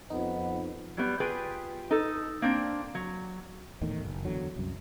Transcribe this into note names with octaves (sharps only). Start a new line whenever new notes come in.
F2 B3 D#4
F#3 G3 B3
F4 G4 G#4 B4 G5
D#4 A4
A#3 C4 D4
F#3
D#1 E2 A2 D#3
F#1
E2 D3 F#3
C2 F#2